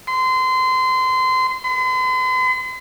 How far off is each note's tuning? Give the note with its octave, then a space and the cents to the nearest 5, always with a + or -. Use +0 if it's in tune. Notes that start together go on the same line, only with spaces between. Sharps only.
C6 -25
C6 -45